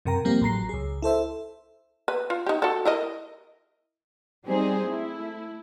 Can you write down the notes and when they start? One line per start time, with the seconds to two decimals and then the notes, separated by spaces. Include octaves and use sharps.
0.05 F#2 C3 A#4 G5 A#5
0.25 F3 G3 A#3 C4 G4
0.41 A1 F#3 A#5 C7
0.69 C#2 G#4
1.02 E4 A4 C5 E5
2.08 B4
2.30 F4
2.46 D#4 G4
2.62 F#4 A4
2.85 E4 A#4 D#5
4.46 G3 C4 D#4 G#4 C5
4.84 A3 E4